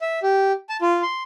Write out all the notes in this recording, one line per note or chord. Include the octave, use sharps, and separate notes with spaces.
E5
G4
A5
F4
C6